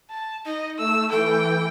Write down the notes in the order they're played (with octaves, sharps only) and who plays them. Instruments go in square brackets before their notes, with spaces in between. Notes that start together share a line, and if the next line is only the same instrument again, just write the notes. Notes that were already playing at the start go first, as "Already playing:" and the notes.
[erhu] A5
[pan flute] D#4 [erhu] D#5
[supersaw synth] A3 [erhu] E6
[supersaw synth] E3 [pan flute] A4 [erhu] G5